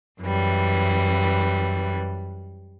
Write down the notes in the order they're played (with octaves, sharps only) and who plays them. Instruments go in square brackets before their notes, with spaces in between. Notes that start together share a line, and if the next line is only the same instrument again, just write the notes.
[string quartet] F#2 E3 G3